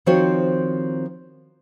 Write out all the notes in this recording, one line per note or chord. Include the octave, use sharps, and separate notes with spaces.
D#3 F3 C4 F#4 C5 C#5